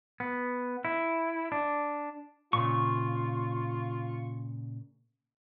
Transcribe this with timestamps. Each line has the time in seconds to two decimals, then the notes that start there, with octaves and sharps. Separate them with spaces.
0.20 B3
0.85 E4
1.52 D4
2.53 A#2 C#3 F4 C#6